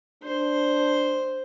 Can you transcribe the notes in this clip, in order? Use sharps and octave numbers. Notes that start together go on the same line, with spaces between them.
D4 C5